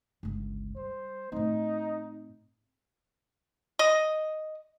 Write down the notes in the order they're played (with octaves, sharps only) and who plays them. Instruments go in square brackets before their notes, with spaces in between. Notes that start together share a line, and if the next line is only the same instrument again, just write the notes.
[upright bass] G1 C#2
[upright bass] G3 [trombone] C5
[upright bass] A2 C4 [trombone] D#4
[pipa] D#5